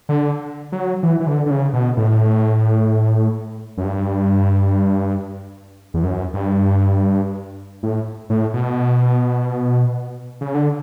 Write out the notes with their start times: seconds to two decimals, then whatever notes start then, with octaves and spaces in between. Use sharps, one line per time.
0.09 D3
0.72 F#3
1.03 E3
1.20 E3
1.27 D3
1.46 D3
1.50 C#3
1.73 B2
1.97 A2
3.77 F#2
3.84 G2
5.94 E2
6.03 F#2
6.34 G2
7.83 A2
8.30 A2
8.53 B2
10.41 C#3
10.54 D3